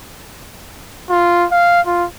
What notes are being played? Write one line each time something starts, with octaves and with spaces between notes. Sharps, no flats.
F4
F5
F4